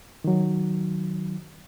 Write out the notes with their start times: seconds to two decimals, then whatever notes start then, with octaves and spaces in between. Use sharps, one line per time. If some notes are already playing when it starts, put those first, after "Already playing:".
0.24 D#3 F#3